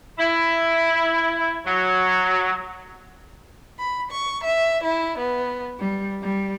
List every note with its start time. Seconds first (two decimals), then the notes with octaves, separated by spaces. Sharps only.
0.19 E4
1.66 F#3
3.78 B5
4.11 C#6
4.45 E5
4.83 E4
5.18 B3
5.79 G3
6.23 G3